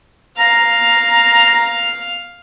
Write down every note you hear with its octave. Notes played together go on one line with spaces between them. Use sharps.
F5 A#5